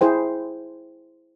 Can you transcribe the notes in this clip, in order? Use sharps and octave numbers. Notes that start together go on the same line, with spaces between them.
E4 G#4 C5 G5